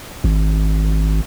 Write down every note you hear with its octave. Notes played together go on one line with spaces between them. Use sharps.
G#1